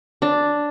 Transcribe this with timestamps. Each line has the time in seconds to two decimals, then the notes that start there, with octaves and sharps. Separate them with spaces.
0.22 D4